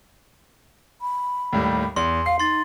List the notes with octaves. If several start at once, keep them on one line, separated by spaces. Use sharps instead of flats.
B5
D#2 A2 G3
E2 C6
F5 C7
D#4 C6 A6